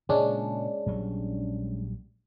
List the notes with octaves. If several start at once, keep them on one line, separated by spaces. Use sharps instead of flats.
A#2 C#3 G#3 C#4 D4
A#1 F#3 G3